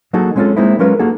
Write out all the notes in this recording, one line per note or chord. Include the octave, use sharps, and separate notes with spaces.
F#3 A#3 D#4 F#4 G#4 A4
G#3 C4 C#4 D#4 F4 A4
G#3 A#3 C4 D#4 E4
F#3 G#3 C#4 F4 A#4 B4
A#3 D#4 F#4 G#4 A4